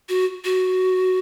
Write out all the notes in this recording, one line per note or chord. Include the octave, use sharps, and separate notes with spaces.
F#4
F#4